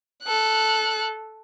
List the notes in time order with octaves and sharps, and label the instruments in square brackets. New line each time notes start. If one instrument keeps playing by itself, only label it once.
[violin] A4 F#6